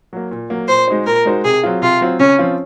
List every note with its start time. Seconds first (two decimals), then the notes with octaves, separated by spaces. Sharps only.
0.13 F#3 A#3
0.31 A#2
0.50 F#3 A#3
0.68 A#2 C5
0.88 G#3 D#4 F#4 C5
1.06 A#2 A#4
1.25 G#3 D#4 F#4 C5
1.44 C3 G#4
1.63 F#3 C4 F4
1.82 C3 F4
2.01 F#3 C4 F4
2.19 C#3 C#4
2.39 F3 C4 F4